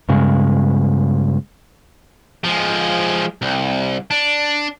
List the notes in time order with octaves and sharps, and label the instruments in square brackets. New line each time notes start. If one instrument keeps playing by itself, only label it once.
[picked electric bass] G2 C#3 G#3
[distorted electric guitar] F3 G#3
C2
D4